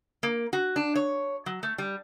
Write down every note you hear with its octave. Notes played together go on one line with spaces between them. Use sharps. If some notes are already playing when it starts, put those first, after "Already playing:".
A#3
F#4
D4
C#5
F#3
A3
G3